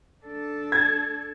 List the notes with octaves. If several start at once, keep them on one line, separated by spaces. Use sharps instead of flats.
D4 A4
G#6 A6